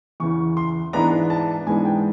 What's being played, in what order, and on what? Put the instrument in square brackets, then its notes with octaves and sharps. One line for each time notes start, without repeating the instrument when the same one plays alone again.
[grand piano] E2 C#3 E3 C#6
C6
G#2 E3 G#3 B3 D4 A#5
A5
G#2 E3 G#3 B3 D4 G#5
G5